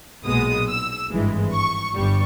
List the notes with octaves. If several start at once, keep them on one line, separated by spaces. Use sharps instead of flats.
B1 A#2 G#3 B3 D#6
E6
G#1 G2 E3 G#3
C#6
G1 G2 G3 C#6